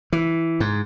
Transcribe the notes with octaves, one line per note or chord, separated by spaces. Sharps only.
E3
G#2